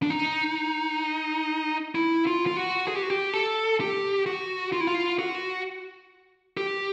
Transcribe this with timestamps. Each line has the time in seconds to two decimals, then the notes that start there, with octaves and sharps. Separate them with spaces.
0.03 D4
0.10 D#4
1.95 E4
2.27 F4
2.47 F4
2.57 F#4
2.88 G#4
2.95 G4
3.03 F#4
3.10 G4
3.34 A4
3.80 G4
4.26 F#4
4.72 F4
4.81 E4
4.87 F4
5.19 F#4
6.57 G4